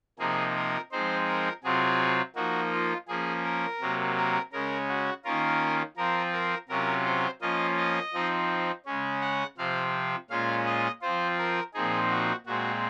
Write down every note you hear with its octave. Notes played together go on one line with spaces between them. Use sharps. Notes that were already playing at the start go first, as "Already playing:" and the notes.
C3 F3 A#3 D#4 G#4
A#4
F3 G#3 C4 D#4 C5
A#4
C3 F#3 C4 F4 G#4
F3 A#3 D#4 F#4
F4
F3 A#3 C#4 G#4
A#4
C3 F#3 A#3
A#4
C#3 G#3 C#4 A#4
F#4
D#3 A#3 C#4 F4 A#4
F3 C4 F4 A#4
A#4
C3 F#3 C#4 F4 A#4
C5
F3 A#3 C#4 F4 D#5
D#5
F3 C4 D#4
C#3 G#3 C#4
F#5
C3 F3 C4 F5
A#2 G#3 C#4 F4 F5
D#5
F3 C4 F4 C5
A#4
A#2 F3 C4 D#4 G#4
F#4
A#2 G#3 C4 F#4